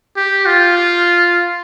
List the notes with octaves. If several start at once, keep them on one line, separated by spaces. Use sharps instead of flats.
G4
F4